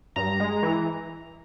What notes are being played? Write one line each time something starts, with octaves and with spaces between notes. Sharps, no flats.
G2 A#5
G#3
E3